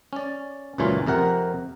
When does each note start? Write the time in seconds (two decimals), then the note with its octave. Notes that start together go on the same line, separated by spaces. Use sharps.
0.13 C#4 D5
0.78 C#2 F#2 A#2 E3 C#4 F4
1.06 F2 C3 A#4 F#5